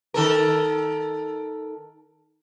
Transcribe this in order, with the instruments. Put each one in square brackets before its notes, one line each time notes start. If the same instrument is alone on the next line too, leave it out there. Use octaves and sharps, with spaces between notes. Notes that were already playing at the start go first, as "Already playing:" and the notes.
[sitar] D#3 A4 A#4